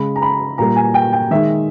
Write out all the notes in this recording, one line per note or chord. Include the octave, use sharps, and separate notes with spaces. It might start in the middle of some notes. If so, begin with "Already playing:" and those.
Already playing: C#3 G#3 B5
A#5
B5
A#2 G3 A#3 A#5
G#5
G5
G5
D#3 G#3 E5